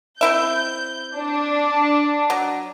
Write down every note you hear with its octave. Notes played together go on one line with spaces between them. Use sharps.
C4 E4 E5 G6
D4
F#3